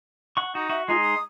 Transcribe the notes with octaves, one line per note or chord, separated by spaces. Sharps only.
F#5 C#6
D#4 F#4
F#4 E5
G#3 D#4 F4 G#4 C6
D#6